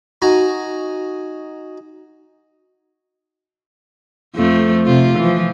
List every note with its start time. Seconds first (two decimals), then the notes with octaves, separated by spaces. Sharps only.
0.22 D#4 F#4 G#5 A#5
4.35 F2 F3 A3
4.86 C3 F4
5.19 E3 F3